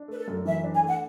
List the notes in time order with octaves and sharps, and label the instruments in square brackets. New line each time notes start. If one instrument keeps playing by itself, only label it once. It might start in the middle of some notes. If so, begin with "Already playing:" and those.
Already playing: [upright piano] D4
[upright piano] A3 [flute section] B4
[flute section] A4
[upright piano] F#2
[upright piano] E3 [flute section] E5
[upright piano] D4
[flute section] G#5
[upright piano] A3 [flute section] F#5